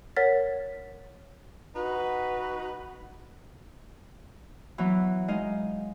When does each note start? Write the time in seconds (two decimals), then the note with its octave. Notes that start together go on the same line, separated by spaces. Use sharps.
0.16 A#4 C#5 F#5 F6 A6 B6
1.76 D#4 F#4 B4
4.78 E3 F#3 B3
5.28 G#3 D#4 D#5 F5